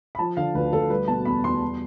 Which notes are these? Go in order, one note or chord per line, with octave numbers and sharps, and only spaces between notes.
B5
F3 A5
D3 F5
D2 B4
D2 A4
G3 B4
B2 A5
E2 B5
E2 C6
G3